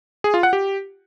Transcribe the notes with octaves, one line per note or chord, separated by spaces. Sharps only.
G#4
F4
F#5
G4